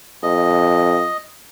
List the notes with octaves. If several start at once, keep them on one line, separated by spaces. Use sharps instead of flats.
F2 D#5